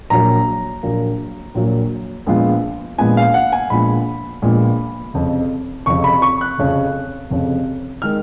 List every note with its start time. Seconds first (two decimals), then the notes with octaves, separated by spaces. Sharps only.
0.10 A#1 A#2 F#3 A#3 A#5
0.83 A#1 A#2 F#3 A#3
1.54 A#1 A#2 F#3 A#3
2.27 A#1 A#2 G#3 B3 F4
2.98 A#1 A#2 G#3 B3 F4 G#5
3.17 F5
3.34 F#5
3.53 G#5
3.70 A#1 A#2 G#3 B3 F4 B5
4.42 A#1 A#2 G#3 B3 F4
5.14 F1 F2 C#3
5.86 F1 F2 C#3 C#6
6.04 B5
6.22 C#6
6.41 F#6
6.58 F1 F2 C#3
7.31 F1 F2 C#3
8.02 D#3 G#3 F6